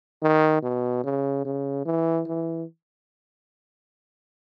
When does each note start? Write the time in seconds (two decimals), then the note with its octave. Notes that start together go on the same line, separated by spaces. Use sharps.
0.22 D#3
0.63 B2
1.04 C#3
1.45 C#3
1.85 E3
2.27 E3